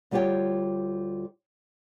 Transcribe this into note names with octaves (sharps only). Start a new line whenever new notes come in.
D2 G3 F4 G4 C#5 G5